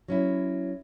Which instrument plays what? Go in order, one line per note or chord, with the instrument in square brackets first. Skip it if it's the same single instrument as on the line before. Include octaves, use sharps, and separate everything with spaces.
[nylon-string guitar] F#3 C#4 E4